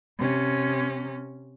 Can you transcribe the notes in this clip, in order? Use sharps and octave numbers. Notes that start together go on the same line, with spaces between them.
C3 C#4